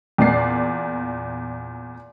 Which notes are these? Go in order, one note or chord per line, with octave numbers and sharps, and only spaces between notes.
E2 A#2 D5 C7